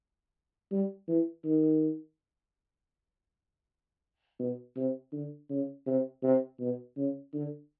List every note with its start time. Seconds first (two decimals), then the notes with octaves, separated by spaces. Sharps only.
0.71 G3
1.08 E3
1.44 D#3
4.39 B2
4.76 C3
5.12 D3
5.50 C#3
5.86 C3
6.23 C3
6.60 B2
6.97 C#3
7.33 D3